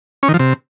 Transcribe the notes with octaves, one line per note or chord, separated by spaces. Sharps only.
C#4
D#3
F3
C3